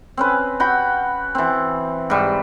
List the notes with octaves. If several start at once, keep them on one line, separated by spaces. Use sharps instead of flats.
C4 C#4 B4
F#4 G5 B5
E3 C4
G#2 G3